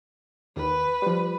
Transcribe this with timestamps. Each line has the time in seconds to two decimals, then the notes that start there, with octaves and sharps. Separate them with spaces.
0.56 D#2 B4
1.02 F3 G3